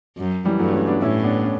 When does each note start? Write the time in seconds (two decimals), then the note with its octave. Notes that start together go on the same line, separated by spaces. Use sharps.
0.17 F#2
0.46 E3 G3
0.59 G2 F#3 A3
0.73 A3 C#4
0.87 B3 D4
1.02 A2 C#4 E4
1.23 B3 D4
1.44 C#4